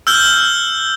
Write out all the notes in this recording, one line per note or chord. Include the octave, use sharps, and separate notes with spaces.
E6 F6 G6 G7